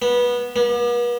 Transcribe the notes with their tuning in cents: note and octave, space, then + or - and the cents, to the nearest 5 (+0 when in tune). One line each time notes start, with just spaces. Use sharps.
B3 -20
B3 -45